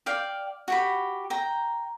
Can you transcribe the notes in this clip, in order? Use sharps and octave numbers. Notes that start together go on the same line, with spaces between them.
D5 F5 G5
F#4 G4 B5
G5 A#5